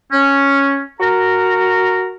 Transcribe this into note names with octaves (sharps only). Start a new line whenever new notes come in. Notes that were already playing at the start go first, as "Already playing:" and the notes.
C#4
F#4 A#4 A#5